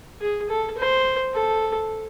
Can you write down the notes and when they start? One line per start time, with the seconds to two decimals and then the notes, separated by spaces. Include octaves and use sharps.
0.21 G#4
0.49 A4
0.78 C5
1.34 A4